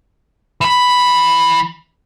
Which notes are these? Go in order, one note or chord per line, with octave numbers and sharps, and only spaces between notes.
E3 B5